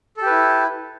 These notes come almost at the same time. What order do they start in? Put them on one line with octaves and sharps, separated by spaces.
A4 G4 B4 E4